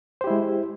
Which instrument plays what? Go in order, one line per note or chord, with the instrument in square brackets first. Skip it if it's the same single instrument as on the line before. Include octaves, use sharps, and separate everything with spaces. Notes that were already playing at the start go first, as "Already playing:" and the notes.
[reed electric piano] C5
G4
E4
G#3